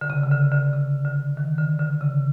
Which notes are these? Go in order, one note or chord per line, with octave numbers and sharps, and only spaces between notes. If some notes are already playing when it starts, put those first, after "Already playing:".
D3
C#3
C#3
D3
D3
C#3
D3
D#3
D3
D3
C#3